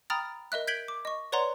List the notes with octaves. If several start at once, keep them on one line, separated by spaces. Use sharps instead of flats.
G5 A#5 B5 D#6 F6 A6
A#4 D#5 E5 F#6
G6 G#6 B6 D7 F#7 G7
D6
D#5 C#6
B4 C#5 D5 F#5 A#5 C6